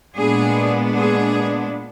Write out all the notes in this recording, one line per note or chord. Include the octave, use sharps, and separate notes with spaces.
A#2 G#3 B3 D4 G#4
G#4